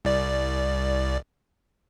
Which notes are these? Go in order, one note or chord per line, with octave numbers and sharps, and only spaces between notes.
C2 D5